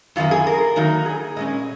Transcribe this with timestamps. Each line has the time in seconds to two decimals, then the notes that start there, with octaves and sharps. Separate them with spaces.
0.16 F#2 D#3 A#3 F4
0.31 G#4
0.47 A#4
0.76 D#3 F#3 A#3 D#4
1.06 G#4
1.37 A#2 G#3 C#4 D#5